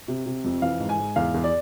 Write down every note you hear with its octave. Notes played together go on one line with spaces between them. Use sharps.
C3
C3
F2
E3 F5
G#2
G#5
G#2
E2 F5
E2
D5